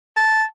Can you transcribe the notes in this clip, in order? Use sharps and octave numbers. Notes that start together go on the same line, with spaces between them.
A5